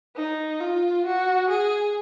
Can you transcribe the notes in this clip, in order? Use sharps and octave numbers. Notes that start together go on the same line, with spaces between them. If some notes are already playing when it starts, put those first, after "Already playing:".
D#4
F4
F#4
G#4